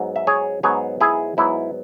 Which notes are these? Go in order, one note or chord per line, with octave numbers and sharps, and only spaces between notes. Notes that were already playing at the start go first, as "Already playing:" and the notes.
Already playing: G#2 F#3 B3
E5
G#4 C#5
G#2 F#3 B3 G#4 C#5
E4 G#4
G#2 F#3 B3 E4